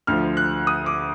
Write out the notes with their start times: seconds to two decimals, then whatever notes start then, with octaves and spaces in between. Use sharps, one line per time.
0.07 D2 D3 F3 F6
0.37 F#6
0.67 D#6
0.86 D6